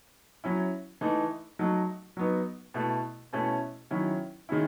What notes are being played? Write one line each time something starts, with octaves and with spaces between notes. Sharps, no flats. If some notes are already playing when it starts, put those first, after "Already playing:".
F#3 C#4 E4
E3 A3 D#4
F#3 A3 D#4
F#3 B3 D#4
B2 A3 E4
B2 A3 C#4 E4
D#3 F#3 C#4 E4
D#3 G#3 C#4 E4